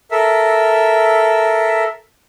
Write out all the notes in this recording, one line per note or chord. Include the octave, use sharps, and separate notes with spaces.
A4 A#4 E5